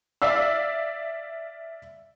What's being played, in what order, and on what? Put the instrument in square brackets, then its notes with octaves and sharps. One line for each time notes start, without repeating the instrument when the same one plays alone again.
[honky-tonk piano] D5 E5 F5 E6